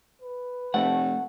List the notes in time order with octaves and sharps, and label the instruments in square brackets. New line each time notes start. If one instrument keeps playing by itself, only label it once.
[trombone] B4
[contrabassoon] F1 [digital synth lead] A3 [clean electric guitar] F#5